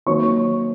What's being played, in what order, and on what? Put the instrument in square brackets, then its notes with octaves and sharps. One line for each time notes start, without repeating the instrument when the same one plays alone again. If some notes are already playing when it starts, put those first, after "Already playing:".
[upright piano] D#3 F#3 A#3 C#5 C#6